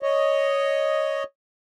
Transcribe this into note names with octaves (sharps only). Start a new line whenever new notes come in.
C#5 D#5